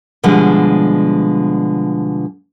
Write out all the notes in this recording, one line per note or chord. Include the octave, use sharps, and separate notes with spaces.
B2 D3 F3 G3 G#3